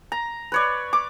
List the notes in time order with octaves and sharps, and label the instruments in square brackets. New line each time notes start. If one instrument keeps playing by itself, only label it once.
[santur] A#5
B4 C#5 D5
D6